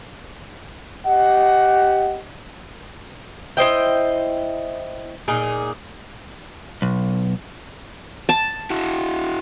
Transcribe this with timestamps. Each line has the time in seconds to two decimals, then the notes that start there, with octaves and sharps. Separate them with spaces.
1.06 G4 D#5 F#5
3.57 E4 C5 D#5 G5
5.28 A#2 D#4 G#4
6.82 B1
8.29 A5
8.70 E4 F#4